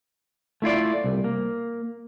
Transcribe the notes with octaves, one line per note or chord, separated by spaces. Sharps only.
A3 E4 F4 D5
C2
A#3